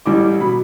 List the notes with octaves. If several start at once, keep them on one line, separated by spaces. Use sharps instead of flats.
A1 A2 G3 D6
B2 F#3 B5